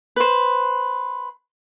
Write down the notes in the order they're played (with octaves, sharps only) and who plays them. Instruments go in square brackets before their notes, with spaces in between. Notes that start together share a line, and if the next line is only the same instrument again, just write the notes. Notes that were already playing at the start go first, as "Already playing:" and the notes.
[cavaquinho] B4 C5